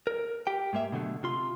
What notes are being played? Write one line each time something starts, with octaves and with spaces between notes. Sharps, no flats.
A#4
G4 G5
G#2 G#3 A#3 E5
B2 D3 F#3 A3
C3 F4 C6